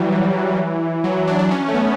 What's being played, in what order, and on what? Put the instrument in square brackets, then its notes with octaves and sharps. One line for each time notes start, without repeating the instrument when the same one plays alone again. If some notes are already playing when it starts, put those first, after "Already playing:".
Already playing: [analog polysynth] E3 F#3 G3
E3
F#3
E3
D4
D4
C#4
A3
B3